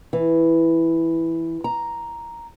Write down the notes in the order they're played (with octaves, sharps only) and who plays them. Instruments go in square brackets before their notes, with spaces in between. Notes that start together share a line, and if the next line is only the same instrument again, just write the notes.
[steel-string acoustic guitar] E3
A#5